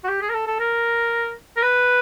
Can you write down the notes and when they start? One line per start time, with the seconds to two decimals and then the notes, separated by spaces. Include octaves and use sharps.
0.04 F#4
0.08 G4
0.21 G#4
0.30 A#4
0.34 A4
0.47 A4
0.60 A#4
1.57 A#4
1.63 B4